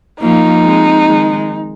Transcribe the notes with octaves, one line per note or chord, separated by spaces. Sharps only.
F3 A#3 D#4
G#3 C4
D#3 G#3